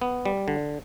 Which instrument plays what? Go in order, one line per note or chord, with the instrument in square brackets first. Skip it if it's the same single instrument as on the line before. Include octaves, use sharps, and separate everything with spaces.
[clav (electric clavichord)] B3
G3
D3